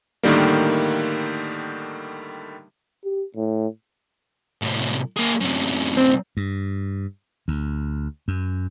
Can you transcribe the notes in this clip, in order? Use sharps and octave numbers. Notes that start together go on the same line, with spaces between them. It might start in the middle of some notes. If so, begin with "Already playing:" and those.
A2 D3 D#3 G3 A#3
G4
A2
A2 C3
A#3 G#4
F#2 C3
C4
G2
D2
F#2